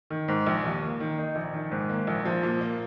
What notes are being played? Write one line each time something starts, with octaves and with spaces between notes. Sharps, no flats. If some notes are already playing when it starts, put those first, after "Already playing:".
D#3
G#2
A#1
D#2
A#3
D#3
D#4
A#1
D#3
G#2
A#3
A#1
F3
A#2
A#3